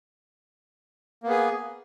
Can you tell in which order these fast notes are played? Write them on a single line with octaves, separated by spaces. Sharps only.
A#3 B3 G#4